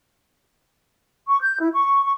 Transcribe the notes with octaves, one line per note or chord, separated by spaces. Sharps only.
C#6
G6
E4
C#6
C#6